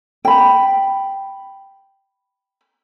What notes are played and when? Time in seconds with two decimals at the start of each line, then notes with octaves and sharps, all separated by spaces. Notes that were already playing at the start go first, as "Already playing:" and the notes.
0.25 G5 B5